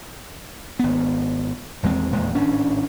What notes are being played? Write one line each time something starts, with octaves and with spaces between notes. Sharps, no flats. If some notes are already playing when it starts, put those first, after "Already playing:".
G#1 B3
D#1 E2 G#3 C4
D#1 E2 A#2 G#3
G#1 A2 C#4 D4